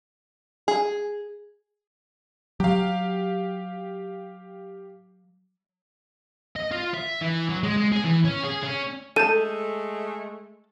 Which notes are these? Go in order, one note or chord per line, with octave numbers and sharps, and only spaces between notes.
G#4
F#3 G4 F5
D#5
F4
E5
E3
F#3
G#3
G#3
G#4
E3
C#4
G#4
C#4
G#3 A3 A4 A5 G6 D#7